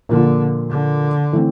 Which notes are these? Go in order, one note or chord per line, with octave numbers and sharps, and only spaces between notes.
A#2 D3 F3 A#3 F4
D3
E3 A3 C4